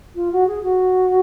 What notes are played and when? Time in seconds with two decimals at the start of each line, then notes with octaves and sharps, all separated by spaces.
0.15 F4
0.32 F#4
0.47 G#4
0.63 F#4